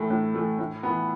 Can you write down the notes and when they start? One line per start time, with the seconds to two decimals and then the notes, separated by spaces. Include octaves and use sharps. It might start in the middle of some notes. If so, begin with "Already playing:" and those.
Already playing: A2 E3 A3 A4
0.10 A2
0.35 E3 A3
0.59 A2
0.83 E3 B3